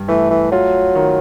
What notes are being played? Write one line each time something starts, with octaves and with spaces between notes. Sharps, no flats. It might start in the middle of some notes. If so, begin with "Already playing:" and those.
Already playing: G2
E3 A3
E3
F#3 F4
D#3